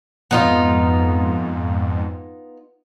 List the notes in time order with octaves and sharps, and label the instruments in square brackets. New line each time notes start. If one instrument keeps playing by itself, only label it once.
[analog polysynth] F2 G#2 [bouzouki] B3 D#4 F4